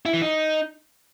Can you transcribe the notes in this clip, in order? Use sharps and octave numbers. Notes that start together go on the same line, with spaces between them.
E4
E3
D#4